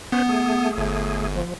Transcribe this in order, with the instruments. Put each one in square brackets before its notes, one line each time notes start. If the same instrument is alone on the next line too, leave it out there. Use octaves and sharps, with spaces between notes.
[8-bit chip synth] B3 [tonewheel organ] C#4 B4 C5
[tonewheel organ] A3 G#4
[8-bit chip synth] G1
[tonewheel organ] F3